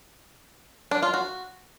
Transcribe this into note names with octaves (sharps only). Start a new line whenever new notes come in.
D4
F4
F#4